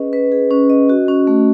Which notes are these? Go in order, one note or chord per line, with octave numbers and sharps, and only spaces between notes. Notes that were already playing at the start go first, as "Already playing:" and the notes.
Already playing: C#4 G#4 B4 D#5
B4
G#4
C#4
D#5
F#4
C#4
A3